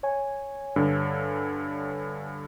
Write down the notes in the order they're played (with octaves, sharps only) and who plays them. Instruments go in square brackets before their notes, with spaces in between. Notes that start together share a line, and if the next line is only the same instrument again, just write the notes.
[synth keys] C#5 G#5
[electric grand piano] G2 D3